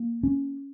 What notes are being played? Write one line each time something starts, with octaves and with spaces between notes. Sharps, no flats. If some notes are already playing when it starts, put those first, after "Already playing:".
Already playing: A#3
C#4